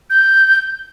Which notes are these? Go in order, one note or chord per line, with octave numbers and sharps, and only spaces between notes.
G6